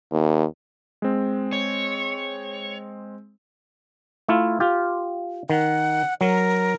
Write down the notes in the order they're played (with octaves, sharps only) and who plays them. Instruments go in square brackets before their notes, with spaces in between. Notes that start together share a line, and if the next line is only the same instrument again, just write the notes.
[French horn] D#2
[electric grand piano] G#3 C4
[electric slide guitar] C#5
[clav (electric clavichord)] A3 E4 F4
F4 G4
[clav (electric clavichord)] D#3 [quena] F#5
[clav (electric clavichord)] F#3 [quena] A#4